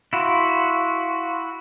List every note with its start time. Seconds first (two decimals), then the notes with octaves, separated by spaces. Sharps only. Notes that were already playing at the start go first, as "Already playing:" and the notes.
0.13 E4 F#4 F5 B5 C6